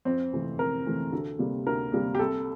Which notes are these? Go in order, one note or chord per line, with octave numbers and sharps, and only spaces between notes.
F2 C4
C3 E3 A3
F2 A#4
C3 E3 A3
D2 A4
C3 G3 A#3
D2 A#4
C3 G3 A#3
G4
C2 A4